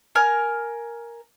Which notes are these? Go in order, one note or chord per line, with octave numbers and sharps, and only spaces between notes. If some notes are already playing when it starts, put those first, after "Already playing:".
A#4 G#5 F6